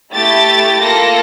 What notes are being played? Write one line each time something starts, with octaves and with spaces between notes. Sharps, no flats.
A3 E4 G4 A6
A#3 F4 A4 A#6